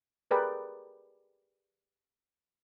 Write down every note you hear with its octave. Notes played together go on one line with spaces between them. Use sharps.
G4 G#4 A#4 B4 D5 G5